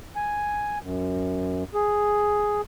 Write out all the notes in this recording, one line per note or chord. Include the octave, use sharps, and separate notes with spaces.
G#5
F#2
G#4